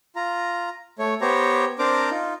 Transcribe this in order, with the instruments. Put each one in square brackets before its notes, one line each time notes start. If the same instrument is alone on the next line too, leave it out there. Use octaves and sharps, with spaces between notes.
[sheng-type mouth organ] F4 A#5
A3 C#5
B3 G4 C5 C#5 A#5
C4 D4 A#4 C5 A#5 D6
D#4 F4